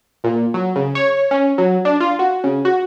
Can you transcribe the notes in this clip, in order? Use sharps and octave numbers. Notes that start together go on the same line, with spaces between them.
A#2
F#3
C#3
C#5
C#4
F#3
D4
F4
F#4
C#3
F#4